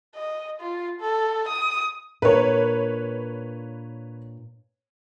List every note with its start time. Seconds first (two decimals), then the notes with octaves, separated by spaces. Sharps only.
0.16 D#5
0.60 F4
1.01 A4
1.49 D#6
2.22 A#2 D4 A#4 B4 C#5